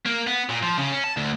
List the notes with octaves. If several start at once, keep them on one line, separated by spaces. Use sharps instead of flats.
A#3
B3
A#2
F3
C#3
C#4
A5
D2